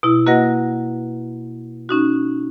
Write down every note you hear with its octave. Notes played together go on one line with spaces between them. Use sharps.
B2 E4
A#3 F#4 B4 D#5 F#5 A#6
C#4 D#4 F#4